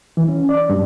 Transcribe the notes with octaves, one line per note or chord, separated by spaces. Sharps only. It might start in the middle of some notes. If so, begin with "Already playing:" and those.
E3
C#4
D5
G2